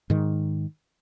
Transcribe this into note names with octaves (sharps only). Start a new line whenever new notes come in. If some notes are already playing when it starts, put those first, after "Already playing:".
G#2 D#3